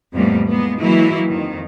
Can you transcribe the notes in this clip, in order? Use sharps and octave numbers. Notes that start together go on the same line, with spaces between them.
F2 A2 E3 G3 A#3 B3
G#3 A#3 B3
E3 F#3 G#3 A#3 E4 F#4
F2 D#3